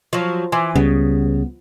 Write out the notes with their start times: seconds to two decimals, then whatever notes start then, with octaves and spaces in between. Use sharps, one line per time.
0.13 F3 F#3
0.52 E3 G#5 C6 D6
0.75 C#2 C#3 G3 B3